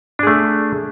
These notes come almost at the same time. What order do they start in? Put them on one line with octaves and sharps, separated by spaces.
D4 G#4 A3